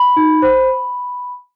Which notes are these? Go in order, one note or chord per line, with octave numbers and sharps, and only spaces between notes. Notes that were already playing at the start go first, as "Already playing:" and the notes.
Already playing: B5
D#4
C5